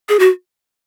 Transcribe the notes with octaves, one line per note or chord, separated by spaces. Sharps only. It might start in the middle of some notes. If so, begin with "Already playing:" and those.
G#4
F#4